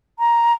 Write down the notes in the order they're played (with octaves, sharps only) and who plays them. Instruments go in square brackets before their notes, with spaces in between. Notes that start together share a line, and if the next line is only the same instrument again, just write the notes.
[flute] A#5